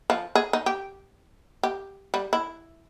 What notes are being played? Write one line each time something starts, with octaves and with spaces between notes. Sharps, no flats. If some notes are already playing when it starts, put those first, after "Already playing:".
F3
G#4
D#4
G4
G4
G3
E4